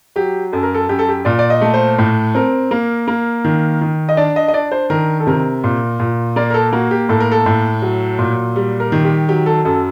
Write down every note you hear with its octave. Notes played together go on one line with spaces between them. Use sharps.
F#3 G4
F#2 A4
A#4
A4
F#2 G4
A4
G4
A#2 D5
D5
D#5
A3
C5
A2
C4 A#4
A#3
A#3
D#3
D#3
D#5
D4 D5
D#5
D#5
D4 D5
C5
D#3 A#4
A4
C3 A#4
A#2
A#2
A#3 D5
A#4
A4
A#3 F#4
G4
A2 A4
A#4
A4
A2
F#3
A#2
G3
A#4
D#3
G4
F#3 G4
A4
F#2 A4